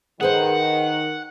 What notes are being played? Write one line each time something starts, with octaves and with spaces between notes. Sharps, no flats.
D#3 G#4 B4 C5 F#5